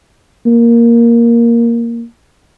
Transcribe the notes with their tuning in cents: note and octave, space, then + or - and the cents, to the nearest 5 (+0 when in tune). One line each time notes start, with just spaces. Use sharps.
A#3 +5